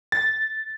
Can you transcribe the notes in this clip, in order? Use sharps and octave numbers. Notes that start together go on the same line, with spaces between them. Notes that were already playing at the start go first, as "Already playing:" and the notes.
A6